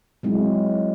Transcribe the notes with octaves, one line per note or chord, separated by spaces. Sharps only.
F#3 G#3 C4 E4